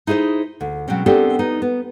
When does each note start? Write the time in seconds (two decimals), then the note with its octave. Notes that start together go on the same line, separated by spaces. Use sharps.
0.07 D#4 E4 G#4 B4 C5
0.61 D2
0.88 B2 F#3 G#3 C4 C#4
1.06 B3 C4 D4 G4 A4 A#4
1.39 B3 D#4
1.62 B3